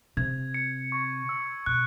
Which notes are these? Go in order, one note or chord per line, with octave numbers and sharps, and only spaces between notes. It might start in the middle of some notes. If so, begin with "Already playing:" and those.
C3 G#6
C#7
C#6
E6
B2 F#6